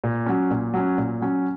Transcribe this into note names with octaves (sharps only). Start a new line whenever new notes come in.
A#2
F#3 C#4
A#2
F#3 C#4
A#2
F#3 C#4